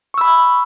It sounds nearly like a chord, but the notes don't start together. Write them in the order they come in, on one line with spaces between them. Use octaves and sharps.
C#6 E6 B5